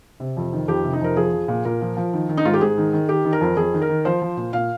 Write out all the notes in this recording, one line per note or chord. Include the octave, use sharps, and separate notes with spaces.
C3
F2
D#3
F2 G4
C3
D#4
F2 A#4
F3 G#4
F3
A#2
A#2 A#4
F3
F3
D#3
D#3
D#4
G#2 F4
G4
G#2 G#4
D#3
D#3
D#3 G4
D#3
A#4
F2
F2 G#4
D#3
A#4
D#3
F3 C5
F3
A#2
A#2 F5